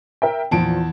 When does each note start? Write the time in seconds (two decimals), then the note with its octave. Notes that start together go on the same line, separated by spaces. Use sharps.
0.22 A#4 E5 G5
0.51 E2 A#2 F3 A5 D7